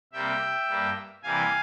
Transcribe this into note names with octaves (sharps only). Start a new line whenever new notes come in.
C3 G3 A#3 E5 G5
G2 G3 A#3
C3 E3 G3 A#3 F5 G#5